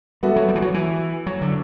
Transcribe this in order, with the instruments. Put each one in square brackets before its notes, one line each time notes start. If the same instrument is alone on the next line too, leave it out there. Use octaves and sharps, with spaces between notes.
[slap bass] G3 [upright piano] B3 F#4 A4 E5
[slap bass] F#3
G3
E3
F#3
E3
F#3
D3